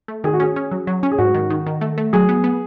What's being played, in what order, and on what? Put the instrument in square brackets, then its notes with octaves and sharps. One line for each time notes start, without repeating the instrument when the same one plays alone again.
[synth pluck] A3
[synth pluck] D#3 [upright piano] G#4
[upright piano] F#4
[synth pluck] C#4 [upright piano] G#4
[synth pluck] C#4
F#3
F#3
C#4
[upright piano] G#4
[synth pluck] G#2 [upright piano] F#4
[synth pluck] D#3
D#3
D#3
A3
A3
[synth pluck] F#3 [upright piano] G#4
[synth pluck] B3
B3